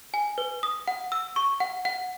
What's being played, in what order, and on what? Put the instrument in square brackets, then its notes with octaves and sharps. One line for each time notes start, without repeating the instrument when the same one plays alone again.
[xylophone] G#5
B4
D#6
F#5
E6
C#6
F#5
F#5